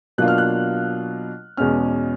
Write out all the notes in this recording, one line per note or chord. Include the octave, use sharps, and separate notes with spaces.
B2 F#3 A#3 D4 F4 F#6
F6
F#6
E2 B2 G#3 C#4 F6